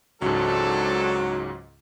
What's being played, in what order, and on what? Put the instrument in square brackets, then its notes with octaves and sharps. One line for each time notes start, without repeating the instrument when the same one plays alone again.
[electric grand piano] C#2 G#2 [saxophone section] F#3 [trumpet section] C4 D4 A4